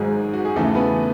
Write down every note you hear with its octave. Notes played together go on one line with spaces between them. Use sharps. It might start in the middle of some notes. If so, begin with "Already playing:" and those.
Already playing: G#1 G#2 F#3 G#3 G#4
F#4
G#4
E2 C#3 E3 A3 A4
B3 B4